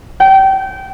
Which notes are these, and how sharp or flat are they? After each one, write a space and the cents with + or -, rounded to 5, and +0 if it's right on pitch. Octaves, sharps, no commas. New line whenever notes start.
G5 -25